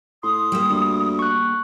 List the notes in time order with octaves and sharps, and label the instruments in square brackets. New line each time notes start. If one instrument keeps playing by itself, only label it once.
[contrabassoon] A2 [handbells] C6 [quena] D#6
[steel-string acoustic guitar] G3 A#3
[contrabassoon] D2
[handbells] C#6 F#6